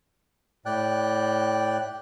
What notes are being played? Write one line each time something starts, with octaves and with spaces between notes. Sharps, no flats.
A2 D5 G5 F#6